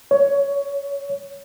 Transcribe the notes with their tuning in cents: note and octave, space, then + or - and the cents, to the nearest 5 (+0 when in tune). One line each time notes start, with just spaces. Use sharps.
C#5 +15